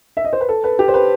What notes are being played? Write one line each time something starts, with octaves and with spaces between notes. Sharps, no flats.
E5
D#5
C5
B4
A4
B4
G4
C5
B4